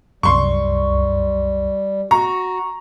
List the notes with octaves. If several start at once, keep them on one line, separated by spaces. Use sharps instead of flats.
C2 F#2 G3 C6 C#6
F#4 A#5 C#6